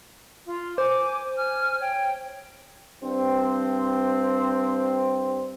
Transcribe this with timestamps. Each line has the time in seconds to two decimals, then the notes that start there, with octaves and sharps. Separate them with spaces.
0.46 F4
0.78 C5 G#5 D6
1.36 G#5 F6
1.79 C#5 G5
3.04 G2 C4